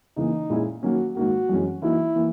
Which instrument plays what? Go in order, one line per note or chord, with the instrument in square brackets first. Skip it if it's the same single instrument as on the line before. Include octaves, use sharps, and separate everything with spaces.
[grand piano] C#3 E3 A#3 [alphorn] D#4
[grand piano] A#2 G#3 C#4 E4 G#4
[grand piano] D#3 F#3 A#3 C#4 [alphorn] F#4
[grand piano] G#2 D#3 A#3 [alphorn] F#4
[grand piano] F#2 E3 G#3 C#4
[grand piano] E3 A#3 D#4 F#4 [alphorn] E4
[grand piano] E3 A#3